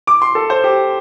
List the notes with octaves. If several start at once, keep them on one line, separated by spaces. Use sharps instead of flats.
D6
C6
A4
C5
G4